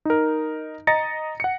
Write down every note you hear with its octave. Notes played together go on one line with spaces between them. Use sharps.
D#4 A#4
D#5 A#5 A6 A#6 C#7
F#5 C#7